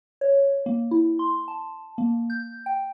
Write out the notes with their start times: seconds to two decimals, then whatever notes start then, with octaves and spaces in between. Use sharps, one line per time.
0.21 C#5
0.66 A#3
0.91 E4
1.19 C6
1.48 A5
1.98 A#3
2.30 G6
2.66 G5